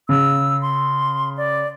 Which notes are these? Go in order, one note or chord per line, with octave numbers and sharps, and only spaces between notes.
C#3 E6
C6
D5